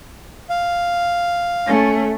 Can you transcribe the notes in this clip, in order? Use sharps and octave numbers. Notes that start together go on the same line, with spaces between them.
F5
A3 C#4